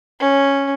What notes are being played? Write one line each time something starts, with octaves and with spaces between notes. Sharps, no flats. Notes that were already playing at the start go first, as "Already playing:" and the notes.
C#4